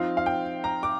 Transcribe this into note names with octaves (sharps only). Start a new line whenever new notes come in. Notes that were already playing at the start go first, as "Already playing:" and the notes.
Already playing: F3 C4 D#4 F5
F5
G5
A#5
D6